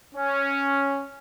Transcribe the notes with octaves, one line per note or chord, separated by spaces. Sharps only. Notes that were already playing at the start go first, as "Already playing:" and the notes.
C#4